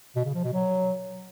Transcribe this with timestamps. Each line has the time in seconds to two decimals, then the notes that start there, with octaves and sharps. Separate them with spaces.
0.16 B2
0.25 C#3
0.35 F3
0.44 B2
0.53 F#3